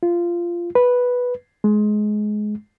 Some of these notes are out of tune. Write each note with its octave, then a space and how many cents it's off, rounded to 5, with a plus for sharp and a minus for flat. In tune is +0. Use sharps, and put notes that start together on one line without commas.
F4 -15
B4 -5
G#3 +20